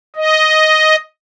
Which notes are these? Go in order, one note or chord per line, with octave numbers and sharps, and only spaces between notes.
D#5